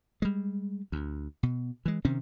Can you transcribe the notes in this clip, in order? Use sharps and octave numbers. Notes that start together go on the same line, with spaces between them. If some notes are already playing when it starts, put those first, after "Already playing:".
G3 G#3
D2
B2
E3 G#3
C3 D#3 C4 C#4